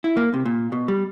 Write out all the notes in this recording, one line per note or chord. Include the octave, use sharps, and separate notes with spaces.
E4
A#3
C3
A#2
B2
G3